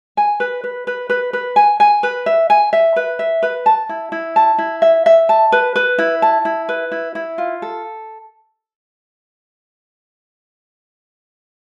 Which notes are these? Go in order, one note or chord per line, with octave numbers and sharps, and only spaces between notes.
G#5
B4
B4
B4
B4
B4
G#5
G#5
B4
E5
G#5
E5
B4
E5
B4
A5
E4
E4
A5
E4
E5
E5
A5
B4
B4
E4
A5
E4
B4
E4
E4
F4
A4